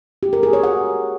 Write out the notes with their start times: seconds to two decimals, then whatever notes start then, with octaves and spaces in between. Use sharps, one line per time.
0.23 G4
0.33 A#4
0.43 G#4
0.53 C#5
0.63 F#5